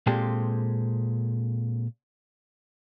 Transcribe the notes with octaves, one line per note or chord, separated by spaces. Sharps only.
A#2 G#3 C4 G4 A4